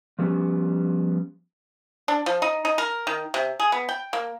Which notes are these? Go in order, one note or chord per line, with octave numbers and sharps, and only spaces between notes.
F3 G3 B3 C#4 F#4 G4
D4
F3
D#4
D#4
A#4
D#3
C3
G#4
B3
G5
A#3